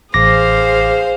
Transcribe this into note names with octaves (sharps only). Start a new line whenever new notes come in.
A1 G#4 C5 F5 D6 A#6